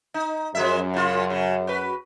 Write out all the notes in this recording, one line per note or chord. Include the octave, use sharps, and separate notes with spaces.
D#4
F#2 F3 G#3 E5
C#3 F4
C#3
F#4 B4